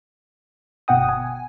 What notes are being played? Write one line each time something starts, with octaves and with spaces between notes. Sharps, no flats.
G1 B2 F#5 G5 D#6
G#5